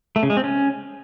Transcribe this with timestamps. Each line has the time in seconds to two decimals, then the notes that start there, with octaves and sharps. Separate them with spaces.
0.16 A3
0.23 C#3
0.30 G#3
0.37 C4
0.44 C#4